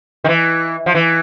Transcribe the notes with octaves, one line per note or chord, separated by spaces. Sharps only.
D#3
E3
F3
E3